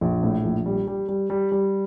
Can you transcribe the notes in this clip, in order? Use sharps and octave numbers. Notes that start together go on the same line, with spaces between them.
A#1
A2
A#1
G3
G3
G3
G3
G3